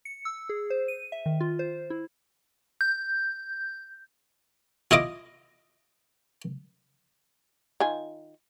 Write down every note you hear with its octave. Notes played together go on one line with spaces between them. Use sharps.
C#7
E6
G#4
C5
D#7
E5
D#3
F4
C5
E4
G6
E4 F4 D#5 D6
D#3 F4 G#5